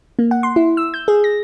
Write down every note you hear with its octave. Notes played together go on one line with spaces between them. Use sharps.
A#3
F#5
C6
E4
E6
G6
G#4
A#6